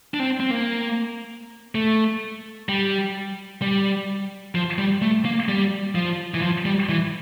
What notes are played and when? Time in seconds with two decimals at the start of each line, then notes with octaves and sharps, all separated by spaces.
0.14 D4
0.20 C4
0.40 C4
0.51 A#3
1.75 A3
2.69 G3
3.62 G3
4.55 F3
4.78 G3
5.02 A3
5.25 A#3
5.48 G3
5.95 F3
6.34 E3
6.42 F3
6.65 G3
6.89 E3